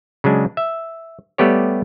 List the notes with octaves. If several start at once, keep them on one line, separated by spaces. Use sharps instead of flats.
C#3 F#3 G#3 D4
E5
G3 A3 B3 G4 C#5